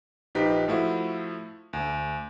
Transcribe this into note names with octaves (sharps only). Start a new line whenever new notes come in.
A#1 F3 D#4 G4 B4 B6
F3 A3 E4 F#4
D2